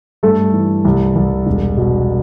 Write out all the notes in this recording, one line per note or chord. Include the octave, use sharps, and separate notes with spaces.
G2 A3 A4
E3
C2
C2
E1
B2